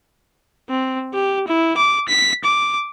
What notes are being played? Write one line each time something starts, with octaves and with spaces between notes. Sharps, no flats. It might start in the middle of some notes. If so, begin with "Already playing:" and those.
C4
G4
E4
D6
B6
D6